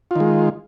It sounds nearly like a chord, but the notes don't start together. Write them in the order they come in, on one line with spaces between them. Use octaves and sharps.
F4 D#3 G#3